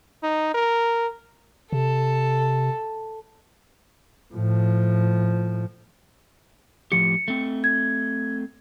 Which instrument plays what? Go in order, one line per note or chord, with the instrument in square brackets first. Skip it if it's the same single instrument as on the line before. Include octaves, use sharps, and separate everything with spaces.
[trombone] D#4
A#4
[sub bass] C3 [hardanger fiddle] A4
[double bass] A2 F3
[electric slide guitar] A2 F3 G4 [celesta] C#7
[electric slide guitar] A3 C4
[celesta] G#6